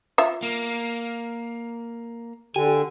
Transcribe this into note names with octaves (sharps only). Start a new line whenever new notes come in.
F4 E5
A#3
D3 G4 G#5